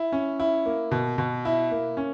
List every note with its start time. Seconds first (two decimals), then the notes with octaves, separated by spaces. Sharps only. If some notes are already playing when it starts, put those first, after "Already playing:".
Already playing: E4
0.12 C#4
0.40 E4
0.66 A#3
0.91 B2
1.18 B2
1.45 E4
1.71 A#3
1.97 C#4